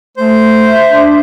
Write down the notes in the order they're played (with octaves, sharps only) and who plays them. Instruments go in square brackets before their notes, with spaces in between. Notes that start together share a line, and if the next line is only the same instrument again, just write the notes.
[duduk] A3 [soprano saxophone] C5
[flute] E5
[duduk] D4